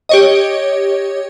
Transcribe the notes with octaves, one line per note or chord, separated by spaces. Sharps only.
G4 C#5 D#5